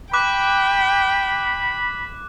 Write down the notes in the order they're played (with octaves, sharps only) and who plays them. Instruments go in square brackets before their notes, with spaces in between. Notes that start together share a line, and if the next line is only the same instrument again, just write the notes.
[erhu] G5 [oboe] B5 [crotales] D6 F#6